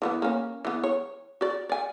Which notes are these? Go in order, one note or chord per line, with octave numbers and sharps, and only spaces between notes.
E3 F#3 B3
A#3 C#4
E3 B3
C#5
F#4 D5
D5 G#5